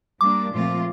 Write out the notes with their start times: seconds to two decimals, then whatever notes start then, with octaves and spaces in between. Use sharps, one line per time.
0.21 G3 A#3 D4 D6
0.52 A#2 F3 A3 C4 F4